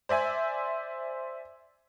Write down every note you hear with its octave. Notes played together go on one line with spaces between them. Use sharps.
C5 D5 E5 G#5